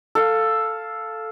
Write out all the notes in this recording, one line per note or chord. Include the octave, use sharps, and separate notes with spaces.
A4 F5